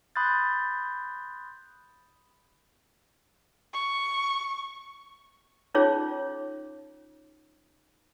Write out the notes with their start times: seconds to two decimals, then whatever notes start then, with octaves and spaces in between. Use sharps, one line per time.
0.16 B5 C6 D#6 F#6 G6 A6
3.74 C#6
5.74 C#4 D#4 F4 G#4 C#5